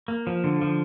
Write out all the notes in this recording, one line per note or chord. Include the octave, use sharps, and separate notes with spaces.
A#3
F3
D3
F3